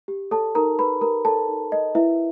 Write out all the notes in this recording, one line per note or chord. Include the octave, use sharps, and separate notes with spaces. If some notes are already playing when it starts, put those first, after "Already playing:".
G4
A4 C#5 A5
D#4 A#4 A#5
A#4 B4 B5
G4 A#4 A#5
A4 C#5 A5
D#4
A#4 D#5
E4 B4 E5